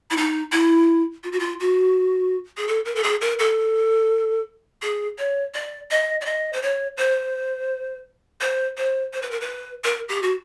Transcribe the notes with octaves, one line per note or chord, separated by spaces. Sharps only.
E4
D#4
E4
F4
F#4
F4
F#4
G#4
A4
A#4
A4
G#4
A#4
A4
G#4
C#5
D5
D#5
D5
D#5
C5
C#5
C5
C5
C5
C5
B4
A#4
B4
A#4
G4
F#4